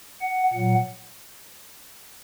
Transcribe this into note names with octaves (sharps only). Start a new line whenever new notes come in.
F#5
A#2 F#3 F#5